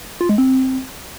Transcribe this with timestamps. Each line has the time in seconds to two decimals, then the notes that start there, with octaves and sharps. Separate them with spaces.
0.21 F4
0.29 G#3
0.38 C4